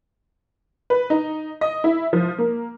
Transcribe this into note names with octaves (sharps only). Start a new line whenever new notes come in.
B4
D#4
D#5
E4
F3
A#3